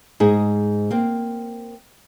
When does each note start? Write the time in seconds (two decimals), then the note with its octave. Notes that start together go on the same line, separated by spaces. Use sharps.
0.20 G#2 G#4 D#5
0.91 A#3 C4